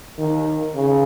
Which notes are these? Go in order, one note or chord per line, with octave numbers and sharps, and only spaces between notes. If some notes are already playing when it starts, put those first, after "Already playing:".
D#3
C#3